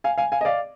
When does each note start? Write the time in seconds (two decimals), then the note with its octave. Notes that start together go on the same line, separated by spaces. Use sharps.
0.04 F5 G#5
0.18 F5 G#5
0.32 F5 G#5
0.41 D#5
0.45 D5 F5